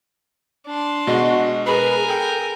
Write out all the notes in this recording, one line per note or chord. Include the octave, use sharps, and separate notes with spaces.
D4 C6
B2 G#3 F#4 D#5
G#4 A#4 B4 G#5 B5
A4 G5